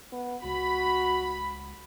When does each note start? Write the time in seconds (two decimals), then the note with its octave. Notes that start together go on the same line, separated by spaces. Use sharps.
0.12 B3
0.44 C#2 F#4 B5